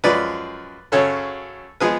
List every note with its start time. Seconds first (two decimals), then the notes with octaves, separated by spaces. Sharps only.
0.04 F#2 F3 G#3 B4 D5
0.92 F#2 C#3 F#3 A4 C#5
1.80 F3 G#3 B3 G#4 B4